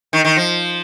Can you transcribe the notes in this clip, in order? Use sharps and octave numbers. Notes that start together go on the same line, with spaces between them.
D#3
D#3
F3